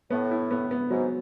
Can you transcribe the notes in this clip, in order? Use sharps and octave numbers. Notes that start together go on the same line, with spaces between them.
A2 B3
E4
B3
B3
G#2 F#3